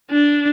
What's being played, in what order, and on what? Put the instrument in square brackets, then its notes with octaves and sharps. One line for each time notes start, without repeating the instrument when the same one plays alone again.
[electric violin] D4